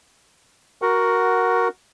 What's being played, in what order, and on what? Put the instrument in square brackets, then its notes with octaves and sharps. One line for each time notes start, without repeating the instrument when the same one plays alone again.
[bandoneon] F#4 A#4 F#5